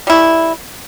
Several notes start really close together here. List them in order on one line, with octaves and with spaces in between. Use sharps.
G3 E4 A3